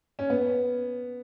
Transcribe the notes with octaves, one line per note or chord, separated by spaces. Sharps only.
C#4
B3